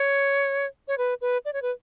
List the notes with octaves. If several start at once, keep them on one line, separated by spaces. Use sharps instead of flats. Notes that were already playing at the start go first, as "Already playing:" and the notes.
Already playing: C#5
C#5
B4
B4
D5
C#5
B4